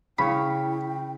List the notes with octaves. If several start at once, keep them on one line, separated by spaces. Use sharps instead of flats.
C#3 E4 C#5 G5 B5